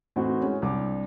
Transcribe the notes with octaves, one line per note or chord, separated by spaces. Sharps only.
A2 E3 C4 D#4 F#4
G#3 C#4
C2 D4 D6